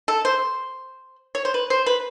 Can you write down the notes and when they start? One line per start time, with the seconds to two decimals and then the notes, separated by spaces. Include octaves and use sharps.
0.08 A4
0.25 C5
1.35 C#5
1.45 C5
1.54 B4
1.70 C5
1.86 B4